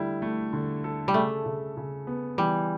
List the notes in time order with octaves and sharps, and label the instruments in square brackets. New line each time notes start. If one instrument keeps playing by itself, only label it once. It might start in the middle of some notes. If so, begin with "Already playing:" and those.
Already playing: [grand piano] D3 A3 E4 [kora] G3
[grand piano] A3
D3
A4
[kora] G3
[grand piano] C#3 [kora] A3
[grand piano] C#3
C#3
B3
[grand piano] E3 [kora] G3